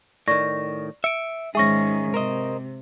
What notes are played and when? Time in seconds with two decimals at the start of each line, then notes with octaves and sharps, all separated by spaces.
0.28 A2 D#3 D5 C#6 A#6
1.04 E5 C#7 D7
1.55 G#2 D#3 C#4 G#4 E5 C#6 A#6
2.14 C3 A#4 C5 D#5